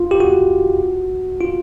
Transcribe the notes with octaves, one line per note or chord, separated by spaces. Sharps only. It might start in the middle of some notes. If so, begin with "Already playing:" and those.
Already playing: F4
G4
F#4
F4